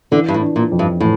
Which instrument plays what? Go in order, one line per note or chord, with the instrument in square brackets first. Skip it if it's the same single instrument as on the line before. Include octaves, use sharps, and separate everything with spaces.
[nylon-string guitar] D3 [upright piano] E3
[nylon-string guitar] G2
A2
[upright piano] D4
[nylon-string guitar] A#2
[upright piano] F2
[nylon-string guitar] G2
[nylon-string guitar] A2 [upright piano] E3